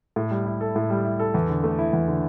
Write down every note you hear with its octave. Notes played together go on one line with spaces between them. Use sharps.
A2
G3
E4
A4
A2
G3
E4
A4
E2
D3
A3
E4
E2
D3